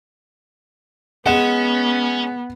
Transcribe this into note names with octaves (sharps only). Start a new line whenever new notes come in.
G#3 B3 C#4 F#5 E7